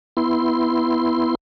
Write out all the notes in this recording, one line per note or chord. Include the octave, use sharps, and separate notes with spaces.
B3 E4 C6